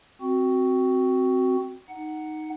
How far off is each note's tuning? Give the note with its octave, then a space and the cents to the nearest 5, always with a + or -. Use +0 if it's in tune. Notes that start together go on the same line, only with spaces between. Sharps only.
C4 -5 F#4 +5
D#4 +0 F#5 +5